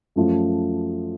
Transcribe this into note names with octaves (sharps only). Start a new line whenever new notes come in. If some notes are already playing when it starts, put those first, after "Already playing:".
F#2 F3 A3